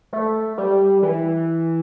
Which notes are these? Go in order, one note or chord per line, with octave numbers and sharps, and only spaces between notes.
A3
G3
E3